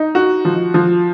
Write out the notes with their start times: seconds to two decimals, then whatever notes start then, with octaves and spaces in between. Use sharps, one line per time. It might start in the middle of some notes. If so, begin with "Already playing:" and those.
Already playing: D#4
0.15 F#4
0.45 F3
0.74 F3